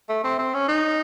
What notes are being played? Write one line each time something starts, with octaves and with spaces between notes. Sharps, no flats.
A3
C4
C4
C#4
D#4